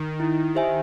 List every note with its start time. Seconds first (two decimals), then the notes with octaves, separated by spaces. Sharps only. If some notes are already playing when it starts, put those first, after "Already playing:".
Already playing: D#3
0.20 E4
0.55 G4 C5 E5 G#5